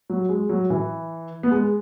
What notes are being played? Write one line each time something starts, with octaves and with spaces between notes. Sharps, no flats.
F#3
G#3
F#3
E3
B3
G#3